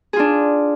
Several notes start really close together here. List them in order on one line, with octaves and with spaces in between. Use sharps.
G#4 F4 D4